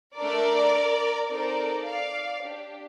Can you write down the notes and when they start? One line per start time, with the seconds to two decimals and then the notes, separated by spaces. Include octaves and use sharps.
0.18 A3 D4 A4 A#4 D5
1.30 C4 D#4 A4 A#4 D5
1.86 D5 F5
2.42 D4 G4